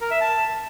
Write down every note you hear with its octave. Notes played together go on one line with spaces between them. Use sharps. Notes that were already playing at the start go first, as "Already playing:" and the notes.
A#4
E5
A5